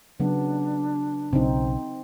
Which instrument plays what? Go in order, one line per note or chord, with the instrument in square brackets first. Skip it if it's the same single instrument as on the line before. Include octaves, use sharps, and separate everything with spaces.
[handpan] C#3 F#3 B3 [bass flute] D4
[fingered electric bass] B1 C#3 [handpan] C4 D#4